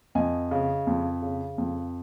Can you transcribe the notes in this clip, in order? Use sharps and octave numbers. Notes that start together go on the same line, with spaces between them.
F2 D#5 G#5
C#3
F2
C#3
F2